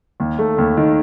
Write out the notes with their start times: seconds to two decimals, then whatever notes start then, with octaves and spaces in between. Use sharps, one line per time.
0.20 D#2
0.39 A3
0.58 D#2
0.77 D#3